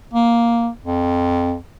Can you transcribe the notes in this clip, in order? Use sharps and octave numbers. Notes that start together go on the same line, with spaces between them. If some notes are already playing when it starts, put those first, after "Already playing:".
A#3
F2